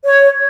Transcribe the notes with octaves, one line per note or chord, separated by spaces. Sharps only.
C#5